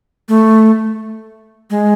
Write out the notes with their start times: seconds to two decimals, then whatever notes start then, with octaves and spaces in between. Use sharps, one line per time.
0.29 A3
1.70 G#3